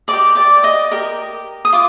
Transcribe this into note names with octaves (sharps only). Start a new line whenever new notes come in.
G4 A#4 D5 D#5 D6
D5 D6
D#5 D#6
G4 A#4 D#5
D#6
F4 D6